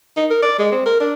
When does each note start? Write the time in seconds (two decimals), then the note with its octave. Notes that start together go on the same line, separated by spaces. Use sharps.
0.17 D#4
0.31 A#4
0.42 D5
0.59 G#3
0.72 C4
0.86 A#4
1.00 D4